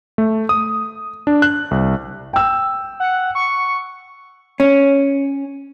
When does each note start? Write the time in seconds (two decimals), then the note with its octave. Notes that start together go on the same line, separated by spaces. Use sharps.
0.18 A3
0.49 D#6
1.27 D4
1.42 F#6
1.71 C2
2.33 G5 E6
3.00 F#5
3.35 C#6
4.60 C#4